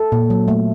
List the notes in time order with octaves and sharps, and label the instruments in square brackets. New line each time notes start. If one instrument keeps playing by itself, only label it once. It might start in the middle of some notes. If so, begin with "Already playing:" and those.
Already playing: [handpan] A4
A#2
F#3
A3